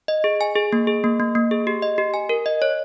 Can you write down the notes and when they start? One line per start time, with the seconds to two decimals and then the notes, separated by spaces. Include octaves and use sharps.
0.08 D#5
0.24 G#4
0.41 G#5
0.56 G#4
0.73 A#3
0.87 G#4
1.04 A#3
1.20 A#3
1.35 A#3
1.51 G#4
1.67 G4
1.82 D#5
1.98 G4
2.14 G#5
2.29 A#4
2.46 D#5
2.62 C#5